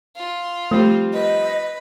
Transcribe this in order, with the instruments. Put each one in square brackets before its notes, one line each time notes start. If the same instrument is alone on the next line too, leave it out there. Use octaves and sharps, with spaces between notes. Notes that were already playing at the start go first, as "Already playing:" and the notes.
[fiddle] F4
[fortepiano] F3 G3 C4 [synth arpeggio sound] A3
[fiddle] B4 [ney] D#5